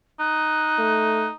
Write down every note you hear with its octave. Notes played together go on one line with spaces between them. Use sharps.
D#4 F#6
A3